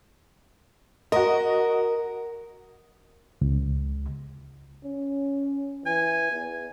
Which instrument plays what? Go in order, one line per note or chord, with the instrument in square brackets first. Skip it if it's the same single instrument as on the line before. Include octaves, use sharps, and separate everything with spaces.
[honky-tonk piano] F#4 D#5 [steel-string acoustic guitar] A#4
[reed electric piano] C#2
[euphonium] C#4
[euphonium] E3 [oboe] G#5
[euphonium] E2